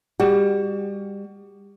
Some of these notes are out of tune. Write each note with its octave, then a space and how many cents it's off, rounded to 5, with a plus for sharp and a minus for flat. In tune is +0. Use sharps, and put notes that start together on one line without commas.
G3 +30 F#4 +35